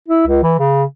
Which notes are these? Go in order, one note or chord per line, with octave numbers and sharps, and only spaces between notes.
E4
C#2
E3
C#3